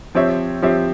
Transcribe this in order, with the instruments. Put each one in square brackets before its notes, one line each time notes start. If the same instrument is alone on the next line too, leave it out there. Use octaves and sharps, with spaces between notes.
[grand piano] F3 C4 G4 C#5 E5
F3 C4 G4 C#5 E5